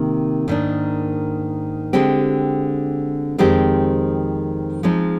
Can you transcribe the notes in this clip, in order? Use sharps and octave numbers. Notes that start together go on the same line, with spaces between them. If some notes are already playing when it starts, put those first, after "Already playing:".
Already playing: C3 D#3 A#3
G#2 D#3 A#3 D4
D3 G#3 C4 G4
F2 D#3 G#3 C4 G4
F3 G#3 C4 D#4